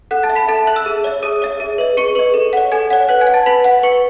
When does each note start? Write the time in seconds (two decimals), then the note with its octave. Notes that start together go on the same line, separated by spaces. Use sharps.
0.11 A4 F#5 F#6
0.23 A5 A6
0.30 E5
0.35 B5 B6
0.48 A4 A5 A6
0.67 E5 F#6 F#7
0.76 E6 E7
0.86 G#4
1.04 C#5 E5
1.23 G#4 D#6 D#7
1.42 C#5 E5
1.60 G#4
1.78 B4 D#5
1.97 G#4 C#6 C#7
2.15 B4 D#5
2.34 A4
2.53 C#5 F#5
2.72 A4 G#5 G#6
2.90 C#5 F#5
3.09 B4 F#5 F#6
3.21 G#5 G#6
3.27 F#5
3.34 A5 A6
3.46 B4 B5 B6
3.64 F#5
3.83 B4 C#6 C#7